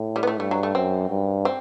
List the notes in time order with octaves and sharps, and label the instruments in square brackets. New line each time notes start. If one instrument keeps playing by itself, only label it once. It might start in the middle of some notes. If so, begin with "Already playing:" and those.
Already playing: [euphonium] A2
[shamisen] G3
B3
A3
[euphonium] G2 [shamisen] A3
[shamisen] F#3
A3
[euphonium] F#2 [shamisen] C4
[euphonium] G2
[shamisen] C4